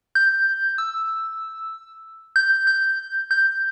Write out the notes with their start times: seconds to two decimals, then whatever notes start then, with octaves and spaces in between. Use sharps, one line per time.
0.15 G6
0.78 E6
2.36 G6
2.67 G6
3.31 G6